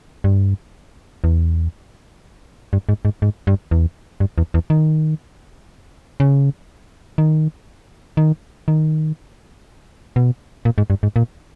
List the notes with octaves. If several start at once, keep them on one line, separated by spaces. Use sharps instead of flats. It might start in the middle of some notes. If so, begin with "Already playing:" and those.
G2
E2
G2
G#2
G#2
G#2
G2
E2
G2
E2
E2
D#3
C#3
D#3
D#3
D#3
B2
A#2
G#2
G2
G#2
A#2